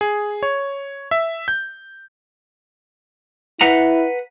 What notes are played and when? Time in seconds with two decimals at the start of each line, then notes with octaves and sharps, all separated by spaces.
0.01 G#4
0.43 C#5
1.11 E5
1.48 G6
3.61 E4 B4 F#5 A#5